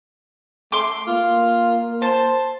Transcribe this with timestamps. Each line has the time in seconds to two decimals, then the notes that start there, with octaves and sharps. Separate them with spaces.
0.72 A3 C6 D6
1.07 A#3 F4
2.02 C5 A5